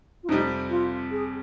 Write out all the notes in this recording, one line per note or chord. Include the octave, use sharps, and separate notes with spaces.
F4
F2 C3 G3 D#4
F4
G#4